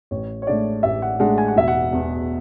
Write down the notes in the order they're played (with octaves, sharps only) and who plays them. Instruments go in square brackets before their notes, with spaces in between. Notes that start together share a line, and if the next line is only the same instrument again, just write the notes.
[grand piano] A1 C#5
C#5
A2 G#3 D4 D5
A1 E5
F#5
A2 G#3 D4 F#5
G#5
F#5
E1 E5
F#5
E2 B2